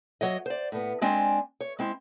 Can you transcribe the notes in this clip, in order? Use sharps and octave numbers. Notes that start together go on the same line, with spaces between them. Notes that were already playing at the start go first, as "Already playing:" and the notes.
F#3 C#5 D#5
C5 D5
A2 B3
G#3 C4 D4 G5 G#5
C#5
G#3 C4 E4